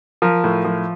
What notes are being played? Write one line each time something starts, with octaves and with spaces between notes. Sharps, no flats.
F3 A#4
A2
F3